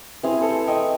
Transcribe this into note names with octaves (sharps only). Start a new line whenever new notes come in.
E3 C4 G#4 F5
A4 C5
D#5 G5 C#6